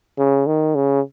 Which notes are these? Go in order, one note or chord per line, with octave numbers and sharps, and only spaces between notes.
C#3
D#3
C#3